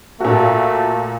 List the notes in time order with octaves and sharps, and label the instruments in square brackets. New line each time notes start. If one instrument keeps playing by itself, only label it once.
[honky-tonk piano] A#2 F#4 [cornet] A3